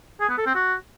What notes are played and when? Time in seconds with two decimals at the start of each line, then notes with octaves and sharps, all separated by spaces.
0.20 G#4
0.29 B3
0.38 A4
0.46 C4
0.55 F#4